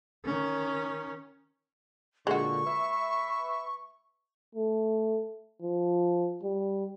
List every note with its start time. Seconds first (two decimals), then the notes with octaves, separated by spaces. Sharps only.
0.25 D#3 C#4
2.27 A#2 D3 G#3 F#4 C#6
2.66 B4 E5
4.55 A3
5.62 F3
6.43 G3